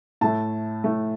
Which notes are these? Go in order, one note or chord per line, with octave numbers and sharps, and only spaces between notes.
A2 A3 A5
A2 A3